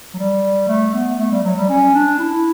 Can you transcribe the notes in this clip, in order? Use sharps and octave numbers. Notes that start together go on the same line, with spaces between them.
F#3
G3
A3
B3
A3
G3
F#3
G3
C#4
D4
E4